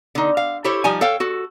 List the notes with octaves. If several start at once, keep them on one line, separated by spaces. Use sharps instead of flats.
D3 D#4
F5
E4 G4 A4 C5 C#5
F3 G3 D#4 G#5
A4 C#5 F5 G5
F#4 A4